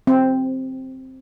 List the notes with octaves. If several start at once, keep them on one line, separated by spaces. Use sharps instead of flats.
C4